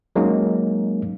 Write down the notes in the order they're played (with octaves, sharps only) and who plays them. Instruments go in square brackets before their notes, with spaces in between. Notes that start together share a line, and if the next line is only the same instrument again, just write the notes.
[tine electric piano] F#3 G#3 A#3 C#4 D#4